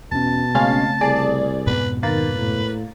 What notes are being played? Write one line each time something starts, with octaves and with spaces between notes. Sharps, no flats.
E2 B2 C#4 A5
C#3 G#3 A3 C4 C#4 F5
C2 G#4 D5
F2 G#2 B2 B4
D#3 A#3 B4 A6
A2